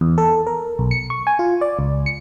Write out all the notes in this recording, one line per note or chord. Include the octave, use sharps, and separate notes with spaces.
E2
A4
A#4
B1
C#7
C#6
G#5
F4
D5
C#2
C#7